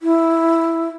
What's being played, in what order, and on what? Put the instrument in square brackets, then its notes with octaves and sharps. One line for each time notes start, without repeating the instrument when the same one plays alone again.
[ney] E4